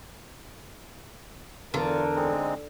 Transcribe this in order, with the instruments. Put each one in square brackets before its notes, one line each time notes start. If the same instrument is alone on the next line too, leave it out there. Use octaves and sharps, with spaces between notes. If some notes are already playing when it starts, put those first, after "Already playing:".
[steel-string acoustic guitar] E2 A4 [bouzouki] D3 [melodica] F4 [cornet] A#4
[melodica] G#3 C4 D#4